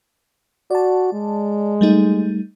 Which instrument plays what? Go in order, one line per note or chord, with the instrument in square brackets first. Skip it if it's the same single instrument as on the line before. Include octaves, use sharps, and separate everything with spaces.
[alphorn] F#4 [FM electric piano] D5 A5
[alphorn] G#3
[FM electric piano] G3 A3 D#4